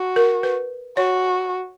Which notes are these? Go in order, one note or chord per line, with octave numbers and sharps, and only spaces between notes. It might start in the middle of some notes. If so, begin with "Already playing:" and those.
Already playing: F#4
A#4
B4
F#4 C#5